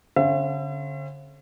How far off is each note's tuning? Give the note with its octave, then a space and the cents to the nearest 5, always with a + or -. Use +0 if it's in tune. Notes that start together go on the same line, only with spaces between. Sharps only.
D3 -30 C4 +45 E5 +40